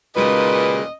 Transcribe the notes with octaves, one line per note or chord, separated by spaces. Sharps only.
D#2 A#2 C#3 G#3 F#4 B4 D#5